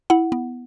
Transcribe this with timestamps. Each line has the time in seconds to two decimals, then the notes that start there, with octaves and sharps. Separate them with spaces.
0.10 E4 F#5
0.32 B3